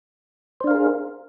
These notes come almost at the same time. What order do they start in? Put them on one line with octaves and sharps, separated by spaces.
C5 D4 F5 A#4 G#4